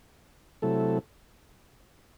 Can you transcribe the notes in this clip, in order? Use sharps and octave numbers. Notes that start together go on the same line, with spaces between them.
C3 F#3 A3 E4 A4